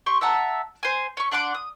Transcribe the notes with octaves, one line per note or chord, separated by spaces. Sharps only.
G4 C6 C#6
E5 F#5 A5 A#5
C5 G#5
C#4 C#6
D4 F#5 C6 D6
D#6